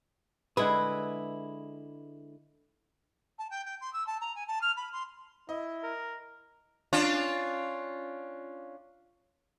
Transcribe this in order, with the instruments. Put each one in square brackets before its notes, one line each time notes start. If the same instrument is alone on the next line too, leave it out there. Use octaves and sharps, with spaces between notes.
[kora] D3 G#3 G#4 [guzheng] E4 [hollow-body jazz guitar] B4
[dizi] A5
G5
G5
C6
E6
A5
A#5
G#5
A5
F6
B5
C6
[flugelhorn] E4 [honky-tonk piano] D#5
[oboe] A#4
[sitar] C#4 D4 F4